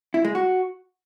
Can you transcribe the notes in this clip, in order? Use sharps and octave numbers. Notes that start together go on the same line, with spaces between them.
E4
G#3
F#4